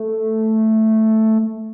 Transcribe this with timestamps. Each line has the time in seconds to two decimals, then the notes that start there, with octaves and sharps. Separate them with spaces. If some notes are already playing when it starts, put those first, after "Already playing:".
Already playing: A3